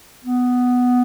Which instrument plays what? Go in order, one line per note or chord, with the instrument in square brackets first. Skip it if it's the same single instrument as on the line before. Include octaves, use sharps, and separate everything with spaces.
[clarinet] B3